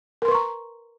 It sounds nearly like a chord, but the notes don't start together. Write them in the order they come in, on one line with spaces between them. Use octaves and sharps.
A#4 C6 B4 C#6 A#5